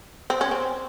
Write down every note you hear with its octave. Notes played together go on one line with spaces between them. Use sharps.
C4
C#4
C4